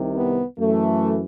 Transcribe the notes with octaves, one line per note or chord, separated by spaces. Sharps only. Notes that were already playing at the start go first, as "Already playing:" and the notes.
Already playing: C2 C3 D#3
B3
F#2 E3 A3